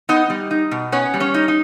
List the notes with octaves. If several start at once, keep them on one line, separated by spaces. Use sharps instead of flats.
B3 D#4 D#5
G3
D#4
B2
B3 C#4 C#5
G3
C#4 C#5
D#4
D#4